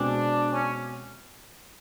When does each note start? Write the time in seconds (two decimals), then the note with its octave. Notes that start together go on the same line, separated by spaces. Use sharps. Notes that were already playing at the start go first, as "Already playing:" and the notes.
Already playing: B2 G#3 C4 D4
0.53 C#4